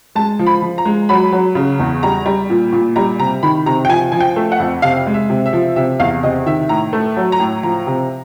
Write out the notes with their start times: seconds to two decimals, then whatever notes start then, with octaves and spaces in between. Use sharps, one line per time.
0.15 G#3 A5
0.39 F3
0.47 B5
0.62 F3
0.78 A#5
0.85 G#3
1.09 F#3 B5
1.32 F#3
1.55 C#3
1.79 E2
2.03 G3 A#5
2.26 G3
2.50 A#2
2.72 A#2
2.96 G3 A#5
3.19 C3 A#5
3.43 D#3 B5
3.66 C3 A#5
3.85 G5
3.89 F3 G#5
4.12 F3 G#5
4.21 G5
4.36 A3
4.52 F#5
4.60 F2
4.82 C3 F5
5.07 G#3
5.14 E5
5.30 C3
5.46 E5
5.53 F3
5.76 C3 E5
5.99 E2 F5
6.23 C3 D#5
6.46 D#3 E5
6.69 A2 A#5
6.93 A3
7.17 F#3
7.32 A#5
7.40 A2
7.63 F3 A#5
7.87 C3